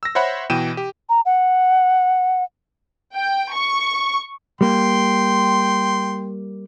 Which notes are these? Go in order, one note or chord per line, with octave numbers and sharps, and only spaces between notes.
E6 A#6
C5 C#5 E5 F#5 B5
B2 E3 G5 D#7 E7
G4
A#5
F#5
G5
C#6
G3 A#3 G5 C6